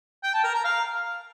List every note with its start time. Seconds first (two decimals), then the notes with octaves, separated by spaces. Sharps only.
0.24 G5
0.34 A5
0.44 A#4
0.54 A#5
0.64 F5